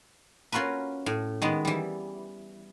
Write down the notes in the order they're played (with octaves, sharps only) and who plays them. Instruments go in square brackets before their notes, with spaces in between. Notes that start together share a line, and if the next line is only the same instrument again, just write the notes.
[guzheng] C#4 F4 F#4 A#4 B4
A2
D#3 G#3 B3
E3 G3